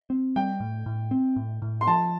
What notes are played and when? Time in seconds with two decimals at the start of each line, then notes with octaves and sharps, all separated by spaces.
0.10 C4
0.36 G3 G5
0.60 A2
0.86 A2
1.11 C4
1.36 A2
1.62 A2
1.81 C6
1.87 F3 A5